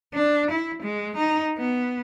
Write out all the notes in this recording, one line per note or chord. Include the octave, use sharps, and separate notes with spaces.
D4
E4
G#3
D#4
B3